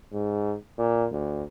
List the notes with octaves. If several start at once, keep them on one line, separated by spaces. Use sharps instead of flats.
G#2
A#2
D2